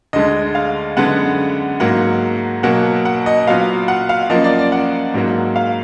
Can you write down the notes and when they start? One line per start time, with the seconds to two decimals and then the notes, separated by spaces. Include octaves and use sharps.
0.13 D2 D3 G#3 D#5
0.55 F5
0.97 F#2 D3 G#3 B3 F#5
1.80 G#2 F#3 A#3 F#5
2.63 B2 F#3 A#3 F#5
3.05 F#5
3.26 D#5
3.47 A#2 F#3 B3 F5
3.88 F#5
4.09 F5
4.30 F#2 F3 A#3 D#5
4.44 D5
4.59 D5
4.72 F#5
5.14 G#2 F#3 A#3
5.56 F5